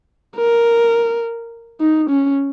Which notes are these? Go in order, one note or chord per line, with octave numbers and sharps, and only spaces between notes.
A#4
D#4
C#4